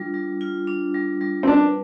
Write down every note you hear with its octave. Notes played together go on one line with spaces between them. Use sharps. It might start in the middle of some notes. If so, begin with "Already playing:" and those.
Already playing: G3 D4 F4
G3
F4
D4
G3
G3
C4
D4 B4